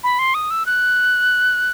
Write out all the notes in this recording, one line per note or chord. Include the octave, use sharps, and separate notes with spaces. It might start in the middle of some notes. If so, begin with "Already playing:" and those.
B5
C6
D#6
E6
F#6